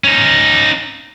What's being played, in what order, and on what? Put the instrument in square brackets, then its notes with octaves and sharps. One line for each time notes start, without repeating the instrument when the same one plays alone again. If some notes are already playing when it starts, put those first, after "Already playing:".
[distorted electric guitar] C#4 D#4